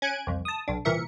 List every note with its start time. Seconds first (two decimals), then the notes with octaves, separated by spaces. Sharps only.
0.02 C#4 G#5 F#6 G#6 D7
0.27 C2 F2
0.45 A5 D#6
0.68 B1 D4
0.85 C2 A#2 E3 A#4 E5 C#7